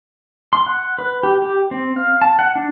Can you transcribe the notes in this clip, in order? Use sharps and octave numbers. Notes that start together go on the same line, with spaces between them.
C6
F#5
B4
G4
G4
C4
F5
A5
F#5
D4